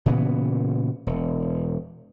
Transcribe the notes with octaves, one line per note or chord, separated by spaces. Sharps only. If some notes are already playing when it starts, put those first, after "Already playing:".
A#2 C#3 E3 B3
E1